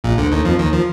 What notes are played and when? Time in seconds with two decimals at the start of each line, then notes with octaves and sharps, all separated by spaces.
0.04 A#1 A#2
0.18 D2 D3
0.32 D#2 D#3
0.45 F2 F3
0.59 D#2 D#3
0.73 F3